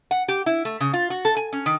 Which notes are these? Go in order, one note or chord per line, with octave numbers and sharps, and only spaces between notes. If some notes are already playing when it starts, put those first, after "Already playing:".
F#5
G4
E4
A3
C#3
F4
F#4
A4
G#5
C#4
D#3